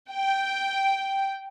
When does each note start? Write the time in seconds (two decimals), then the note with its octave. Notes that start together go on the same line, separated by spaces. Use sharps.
0.11 G5